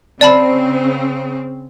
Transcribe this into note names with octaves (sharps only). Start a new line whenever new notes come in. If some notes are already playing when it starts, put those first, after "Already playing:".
C#3 C4 D5 A5 B5